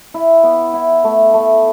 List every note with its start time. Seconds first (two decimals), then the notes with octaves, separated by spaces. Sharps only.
0.14 E4
0.43 B3
0.74 E4
1.04 A3
1.34 A3